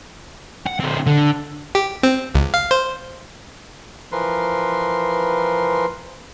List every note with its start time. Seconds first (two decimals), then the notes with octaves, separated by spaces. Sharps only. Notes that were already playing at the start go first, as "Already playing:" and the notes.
0.67 F#5
0.80 D3 C4
1.07 D3
1.75 G4
2.03 C4
2.35 C#2
2.54 F5
2.71 C5
4.12 E3 F3 A#4 B4 C6